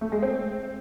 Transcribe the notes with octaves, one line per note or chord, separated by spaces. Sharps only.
A3
G#3
C4